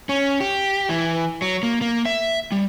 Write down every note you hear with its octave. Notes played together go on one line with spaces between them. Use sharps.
C#4
G4
E3
F#3
A#3
A#3
E5
G3